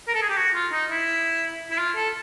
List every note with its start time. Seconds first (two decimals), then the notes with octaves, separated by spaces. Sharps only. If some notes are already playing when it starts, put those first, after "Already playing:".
0.08 A#4
0.14 A4
0.22 G#4
0.29 G4
0.37 F#4
0.55 F4
0.72 D#4
0.90 E4
1.71 E4
1.78 F4
1.96 A4